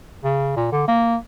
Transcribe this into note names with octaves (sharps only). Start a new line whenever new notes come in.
C#3
A#2
D3
A#3